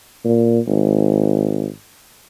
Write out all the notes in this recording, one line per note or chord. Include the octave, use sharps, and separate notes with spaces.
A#2
G#1